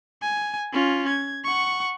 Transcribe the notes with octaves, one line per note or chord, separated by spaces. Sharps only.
G#5
C#4 F4
G#6
F#5 C#6